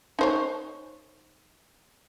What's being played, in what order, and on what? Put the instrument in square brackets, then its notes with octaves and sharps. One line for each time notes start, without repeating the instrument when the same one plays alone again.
[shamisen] D#4 C5 C#5